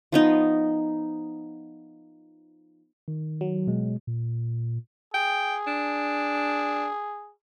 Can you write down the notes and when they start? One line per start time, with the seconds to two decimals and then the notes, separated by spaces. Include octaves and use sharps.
0.12 F3 B3 D#4
3.08 D#3
3.41 F#3
3.67 B2 G#3
4.07 A#2
5.14 G#4 G5
5.67 D4